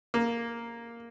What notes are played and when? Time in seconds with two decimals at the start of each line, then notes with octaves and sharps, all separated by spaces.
0.14 A#3